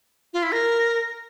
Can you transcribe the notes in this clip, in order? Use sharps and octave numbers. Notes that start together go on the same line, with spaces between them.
F4
E4
A#4